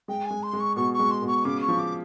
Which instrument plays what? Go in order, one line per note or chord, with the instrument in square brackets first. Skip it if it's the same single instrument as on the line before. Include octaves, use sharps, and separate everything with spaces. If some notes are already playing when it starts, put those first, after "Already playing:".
[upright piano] G#3 [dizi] G5
[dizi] G#5
[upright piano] G#3
[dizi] C6
[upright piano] G#3
[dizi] C#6
[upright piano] B2 [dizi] C#6
[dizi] C#6
[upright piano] G#3
[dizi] C6
[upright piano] B2
[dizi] C#6
[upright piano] C#3 [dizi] D6
[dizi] C#6
[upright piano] F3
[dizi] D6